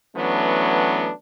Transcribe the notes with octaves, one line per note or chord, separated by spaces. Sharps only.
E3 F#3 A3 B3 C#4 D4